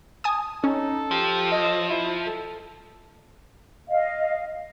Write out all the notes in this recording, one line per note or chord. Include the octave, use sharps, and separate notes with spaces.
G#5 A5 D#6
C#4 D#4 A4
F3 G4
D#5
E4
A4
D#5 F5